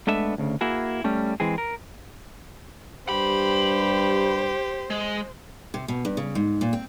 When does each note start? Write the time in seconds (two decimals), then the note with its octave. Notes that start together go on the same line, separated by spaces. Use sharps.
0.07 G#3 A3 B3 D4 A4 E5
0.38 D2 C#3
0.61 A#3 E4 F#4 G#4
1.04 G3 A3 C#4
1.40 E3 G#3 C4 G#4
1.58 A#4
3.09 G2 G4 C5 B5
4.90 G#3
5.74 C3
5.88 B2
6.05 G2
6.17 C#3
6.35 G#2
6.61 A#2
6.73 C4